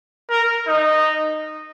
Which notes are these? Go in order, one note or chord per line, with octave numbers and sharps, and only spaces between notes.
A#4
D#4